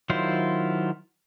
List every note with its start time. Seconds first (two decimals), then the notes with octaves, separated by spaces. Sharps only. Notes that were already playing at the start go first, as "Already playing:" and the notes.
0.10 D#3 F#3 E4 F4 C5